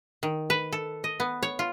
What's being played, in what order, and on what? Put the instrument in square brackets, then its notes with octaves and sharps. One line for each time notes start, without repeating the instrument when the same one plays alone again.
[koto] D#3
B4
A4
D#5
B3
C#5
F4